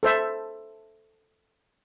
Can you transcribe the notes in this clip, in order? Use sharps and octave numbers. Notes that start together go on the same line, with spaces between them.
A4 C5 E5